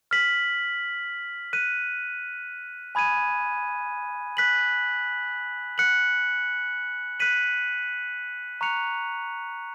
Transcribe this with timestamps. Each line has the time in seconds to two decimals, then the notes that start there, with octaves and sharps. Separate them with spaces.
0.11 F6 B6 F#7
1.53 F#6 B6 D#7
2.95 G#5 B5 D#6 G#6 D#7
4.37 F#6 B6 F#7
5.78 F#6 C#7 F#7
7.20 F#6 B6 D#7 F#7
8.61 A#5 C#6 F#6 C#7 F7